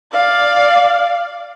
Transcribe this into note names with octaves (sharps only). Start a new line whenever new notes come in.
D5 F5